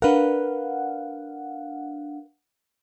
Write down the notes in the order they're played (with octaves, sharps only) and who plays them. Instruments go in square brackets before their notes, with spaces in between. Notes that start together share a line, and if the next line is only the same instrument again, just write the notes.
[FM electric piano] D4 F5 F#5 [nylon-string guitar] A#4 B4